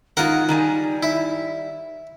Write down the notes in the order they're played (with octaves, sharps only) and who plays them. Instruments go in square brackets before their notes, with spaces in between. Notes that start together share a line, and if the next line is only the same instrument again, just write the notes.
[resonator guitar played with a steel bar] D#3 G#3 F4 [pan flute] D#4 [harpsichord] A#4 F#5
[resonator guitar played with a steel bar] D#3 G3 G#5
[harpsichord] E4